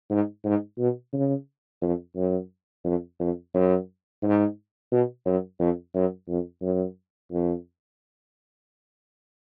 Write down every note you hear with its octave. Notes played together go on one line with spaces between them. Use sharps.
G#2
G#2
B2
C#3
F2
F#2
F2
F2
F#2
G#2
B2
F#2
F2
F#2
F2
F#2
F2